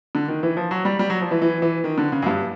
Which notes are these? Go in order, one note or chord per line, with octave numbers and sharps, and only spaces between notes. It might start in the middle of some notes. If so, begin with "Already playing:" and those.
D3
D#3
E3
F3
F#3
G3
G3
F#3
F3
E3
E3
E3
D#3
D3
C#3
F#2
G2